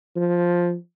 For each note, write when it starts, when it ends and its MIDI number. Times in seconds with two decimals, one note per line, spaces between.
0.16 0.75 53